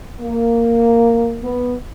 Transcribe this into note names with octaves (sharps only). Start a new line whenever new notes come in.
A#3
B3